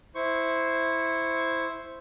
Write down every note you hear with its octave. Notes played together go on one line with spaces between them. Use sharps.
E4 C5 C#6